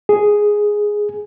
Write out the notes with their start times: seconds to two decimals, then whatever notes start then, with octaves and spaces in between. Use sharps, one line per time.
0.09 G#4